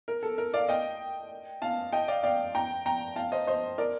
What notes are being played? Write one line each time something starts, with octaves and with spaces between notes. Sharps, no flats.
A#4
A4
A#4
D5 F5
D#5 G5
F5 A5
D#5 G5
D5 F5
D5 F5
G5 A#5
G5 A#5
F5 A5
C5 D#5
C5 D#5
A#4 D5